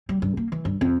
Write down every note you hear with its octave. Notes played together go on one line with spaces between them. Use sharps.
G3
G2
A#3
E3
G2
F2